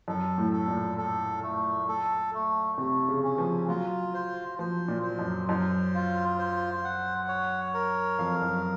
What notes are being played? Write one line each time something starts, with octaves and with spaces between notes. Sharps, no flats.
F#2 A4
A2
A4
A#2
A4
A3
A4
A3
C3 A3
C#3
C#4
F3
F#3 F4
C5
F3 C5
A#2
C5
F#2
F#2 C5
F4
C5
F#5
C#5
A#4
F2 F5
F#2